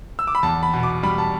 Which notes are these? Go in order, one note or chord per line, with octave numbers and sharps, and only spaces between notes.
E6
D6
B5
E2 A5
B5
B2
D6
G3 B5
A5